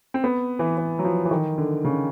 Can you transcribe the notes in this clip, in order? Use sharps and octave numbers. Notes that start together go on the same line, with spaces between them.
C4
B3
E3
E3
F#3
F3
E3
D#3
D3
C#3